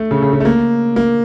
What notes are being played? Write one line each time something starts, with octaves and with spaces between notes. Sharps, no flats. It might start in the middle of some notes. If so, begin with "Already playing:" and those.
Already playing: A3
C#3
C#3
C#3
A3
A#3
A#3